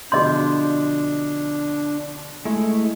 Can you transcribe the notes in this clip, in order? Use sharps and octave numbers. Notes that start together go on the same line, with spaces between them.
B2 D3 F3 D4 G#4 D#5 C6 G6
G#3 A3 E4